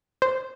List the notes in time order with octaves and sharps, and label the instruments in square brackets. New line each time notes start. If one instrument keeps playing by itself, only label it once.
[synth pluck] C5